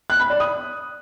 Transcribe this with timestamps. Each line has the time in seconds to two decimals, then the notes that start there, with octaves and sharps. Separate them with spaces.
0.10 F#6
0.20 B5
0.30 D5
0.40 D#6